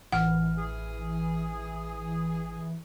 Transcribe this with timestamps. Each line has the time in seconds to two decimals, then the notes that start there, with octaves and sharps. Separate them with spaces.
0.12 A1 E3 F#5 F6
0.58 G#4